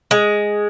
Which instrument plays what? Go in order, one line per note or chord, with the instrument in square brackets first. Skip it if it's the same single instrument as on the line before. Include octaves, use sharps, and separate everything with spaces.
[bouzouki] G#3